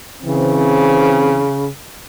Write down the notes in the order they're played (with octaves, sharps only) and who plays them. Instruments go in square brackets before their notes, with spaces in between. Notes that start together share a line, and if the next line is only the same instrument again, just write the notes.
[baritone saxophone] C#3 [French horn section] E3 C4